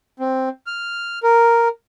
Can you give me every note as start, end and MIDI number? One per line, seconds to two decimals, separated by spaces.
0.19 0.49 60
0.66 1.19 89
1.23 1.68 70